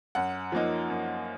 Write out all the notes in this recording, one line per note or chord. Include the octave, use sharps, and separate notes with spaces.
F#2 F#5
F3 A#3 D#4
F#2